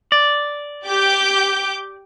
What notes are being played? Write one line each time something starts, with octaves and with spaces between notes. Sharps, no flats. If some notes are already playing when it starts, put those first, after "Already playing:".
D5
G4 D6 G6